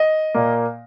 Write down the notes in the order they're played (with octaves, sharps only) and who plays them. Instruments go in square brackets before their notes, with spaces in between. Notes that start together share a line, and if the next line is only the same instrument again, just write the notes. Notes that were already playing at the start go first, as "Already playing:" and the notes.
Already playing: [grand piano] D#5
A#2 A#3